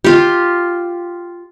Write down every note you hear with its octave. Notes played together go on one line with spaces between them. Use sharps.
F4 G4